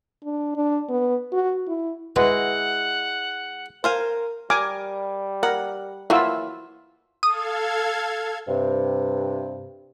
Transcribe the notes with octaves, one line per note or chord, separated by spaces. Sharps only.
D4
D4
B3
F#4
E4
G#3 E4 F#4 B4 F#5
A#4 C5 F5 G#5
G3 A#4 G#5 D6
A#4 F#5
E3 F#3 A#3 E4 F4 E6
A4 F5 D#6 G#6
G2 C3